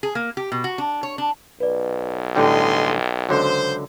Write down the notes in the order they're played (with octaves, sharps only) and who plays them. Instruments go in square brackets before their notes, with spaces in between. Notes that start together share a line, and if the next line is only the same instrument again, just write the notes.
[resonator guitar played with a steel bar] G#4
A#3
G4
B2
F#4
D4
C#5
D4
[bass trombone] B1 [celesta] B4 D5
[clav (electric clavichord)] A2 D3 G3 [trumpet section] D#5 G#5 C6 [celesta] G5
[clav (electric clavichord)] C#2 D3 F#3 [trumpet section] C5